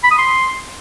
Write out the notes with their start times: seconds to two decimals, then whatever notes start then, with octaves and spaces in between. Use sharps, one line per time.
0.04 B5
0.11 D#6
0.18 C6